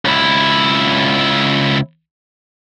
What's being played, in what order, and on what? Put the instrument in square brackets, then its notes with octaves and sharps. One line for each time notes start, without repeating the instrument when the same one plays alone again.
[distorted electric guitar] C#2 E4